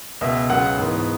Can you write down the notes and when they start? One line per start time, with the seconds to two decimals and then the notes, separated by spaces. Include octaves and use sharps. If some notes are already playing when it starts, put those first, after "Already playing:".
0.21 C#2 B2 B3 E5
0.50 C#2 C#3 F#3 B3 F#5
0.78 G#2 E3 B3